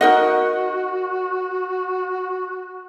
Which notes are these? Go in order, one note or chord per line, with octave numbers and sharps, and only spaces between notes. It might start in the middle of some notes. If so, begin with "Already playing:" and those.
D#4 F#4 A#4 D#5 F#5